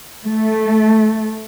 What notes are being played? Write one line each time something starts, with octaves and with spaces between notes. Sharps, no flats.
A3